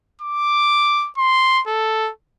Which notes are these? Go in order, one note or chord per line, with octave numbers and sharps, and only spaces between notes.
D6
C6
A4